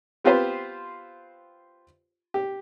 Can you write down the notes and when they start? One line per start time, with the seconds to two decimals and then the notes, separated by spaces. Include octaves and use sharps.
0.24 B3 C4 F4 G4 B4 C5
2.34 G4